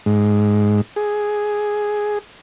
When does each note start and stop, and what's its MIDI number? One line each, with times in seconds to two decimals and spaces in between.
0.06 0.81 44
0.96 2.19 68